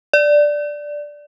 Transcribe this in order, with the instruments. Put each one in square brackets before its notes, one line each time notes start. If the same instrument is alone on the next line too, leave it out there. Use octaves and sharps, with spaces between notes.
[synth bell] D5